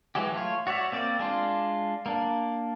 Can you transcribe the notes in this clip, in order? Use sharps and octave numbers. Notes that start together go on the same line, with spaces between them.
E3 F#3 G#3 G4
A3 F4 C#5
F#4 C#5 D5 E5
A#3 C4 D5
G#3 D4 F4
A#3 D4